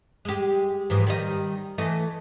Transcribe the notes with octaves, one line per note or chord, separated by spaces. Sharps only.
G#3 G4
G#2 E3 F3
D#3 G3 D#5
E3 A3 D#5